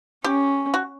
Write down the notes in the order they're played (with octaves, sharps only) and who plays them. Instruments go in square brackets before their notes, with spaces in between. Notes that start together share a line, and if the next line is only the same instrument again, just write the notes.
[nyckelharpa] C#4 [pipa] G4
[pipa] F#4